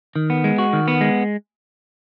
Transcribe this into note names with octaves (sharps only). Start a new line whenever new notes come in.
D#3
B3
G#3
F#4
D#3
B3
G#3